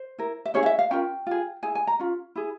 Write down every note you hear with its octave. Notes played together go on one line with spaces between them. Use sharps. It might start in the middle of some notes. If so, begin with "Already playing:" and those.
Already playing: C5
E4 A#4
E5
C#4 E4 G#4 C#5
F5
E5
F5
C#4 F4 A#4 G5
F4 G#4
E4 G#4 G#5
G#5
A#5
C#4 F4
E4 G#4